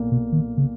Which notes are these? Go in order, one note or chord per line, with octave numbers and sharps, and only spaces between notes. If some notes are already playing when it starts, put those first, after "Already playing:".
Already playing: B1 A#2 A#3
B2
D#3
C#3